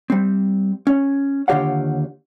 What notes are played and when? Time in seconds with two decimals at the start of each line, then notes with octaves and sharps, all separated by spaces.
0.10 G3 C4
0.87 C#4
1.48 D#2 D3 F4 G4 C#5 F#5